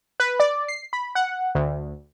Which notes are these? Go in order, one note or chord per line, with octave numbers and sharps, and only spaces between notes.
B4
D5
C7
B5
F#5
D2